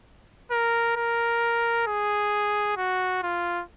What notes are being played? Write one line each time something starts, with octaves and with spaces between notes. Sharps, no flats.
A#4
A#4
G#4
F#4
F4